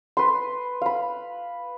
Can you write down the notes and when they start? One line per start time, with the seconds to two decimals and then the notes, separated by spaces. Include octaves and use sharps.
0.17 B4 C6
0.82 F5 B5